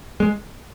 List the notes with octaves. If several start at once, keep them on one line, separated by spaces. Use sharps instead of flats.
G#3